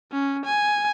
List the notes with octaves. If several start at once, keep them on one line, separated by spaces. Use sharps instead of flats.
C#4
G#5